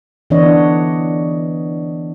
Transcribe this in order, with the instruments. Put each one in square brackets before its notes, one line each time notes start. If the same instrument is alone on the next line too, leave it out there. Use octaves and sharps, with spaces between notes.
[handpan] D3 E3 B3 D4 C#5 D#5